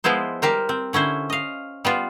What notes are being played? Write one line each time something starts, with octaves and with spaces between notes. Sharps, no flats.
F3 G#3 B3 E4 C5
G3 G4 A#4 C5
C4
D3 C#4 E4 C5
D#5 F5
G3 B3 F4